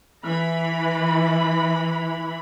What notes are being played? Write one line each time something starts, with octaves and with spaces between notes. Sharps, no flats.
E3 B5